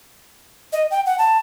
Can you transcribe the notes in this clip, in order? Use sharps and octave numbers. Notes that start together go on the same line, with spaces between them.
D#5
G5
F#5
A5